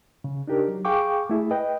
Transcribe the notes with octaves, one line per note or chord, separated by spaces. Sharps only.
C#3
D4 D#4 G4 A#4
F#3
G#4 F5 G5 C#6 D6
A3 E4 G#4
B4 D#5 G5